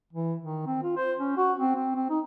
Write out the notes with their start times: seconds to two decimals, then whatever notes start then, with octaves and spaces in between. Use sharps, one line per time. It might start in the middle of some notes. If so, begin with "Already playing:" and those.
0.13 E3
0.42 D#3
0.66 C4
0.83 F4
0.97 C5
1.18 C#4
1.37 F#4
1.59 C4
1.76 C4
1.95 C4
2.10 D#4